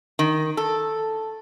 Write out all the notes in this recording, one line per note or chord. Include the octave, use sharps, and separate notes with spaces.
D#3
A4